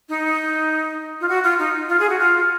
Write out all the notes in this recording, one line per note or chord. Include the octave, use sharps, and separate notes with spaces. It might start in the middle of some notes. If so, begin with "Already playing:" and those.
D#4
F4
F#4
F4
D#4
F4
G#4
F#4
F4